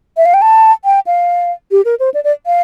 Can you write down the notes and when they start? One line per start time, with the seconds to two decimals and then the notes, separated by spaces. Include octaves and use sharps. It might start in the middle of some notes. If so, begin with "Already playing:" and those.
0.17 E5
0.26 F5
0.34 G5
0.42 A5
0.85 G5
1.07 F5
1.71 G4
1.85 A#4
2.00 C5
2.14 D5
2.24 D5
2.46 F5